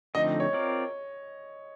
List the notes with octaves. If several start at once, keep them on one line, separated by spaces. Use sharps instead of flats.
D3 F3 A3 C4 D#4 D#5
C#5
C4 F4 A#4 D5